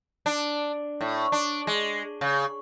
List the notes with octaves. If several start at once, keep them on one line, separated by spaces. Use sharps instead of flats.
D4
A2
D4
G#3
C#3